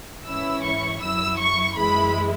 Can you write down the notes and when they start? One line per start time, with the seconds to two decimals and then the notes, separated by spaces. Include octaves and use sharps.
0.25 G#2 E3 C#4 E4 E6
0.63 C#6
1.01 F#2 F#3 E4 E6
1.39 C#6
1.77 F#2 E3 G#3 E4 B5